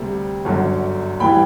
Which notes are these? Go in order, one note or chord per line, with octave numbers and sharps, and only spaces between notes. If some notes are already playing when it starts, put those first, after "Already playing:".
Already playing: D2 C3 G3
G1 F#2 D3 F#3
A1 E3 G3 G5 B5